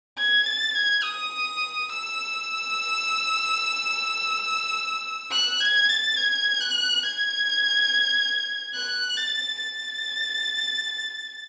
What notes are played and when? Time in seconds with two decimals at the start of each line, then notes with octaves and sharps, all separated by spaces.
0.18 G#6
0.46 A6
0.75 G#6
1.03 D#6
1.89 E6
5.31 F#6
5.60 G#6
5.88 A6
6.17 G#6
6.60 F#6
7.03 G#6
8.74 F#6
9.17 A6
9.59 A6